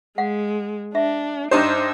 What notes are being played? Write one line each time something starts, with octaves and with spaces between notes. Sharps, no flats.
G#3 F5 F#5
D4 E5
G2 D4 D#4 G4 C5 E5